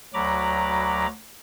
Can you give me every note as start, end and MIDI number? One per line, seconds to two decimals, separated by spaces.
0.14 1.06 38
0.14 1.06 54
0.14 1.06 82
0.14 1.06 83
0.14 1.06 86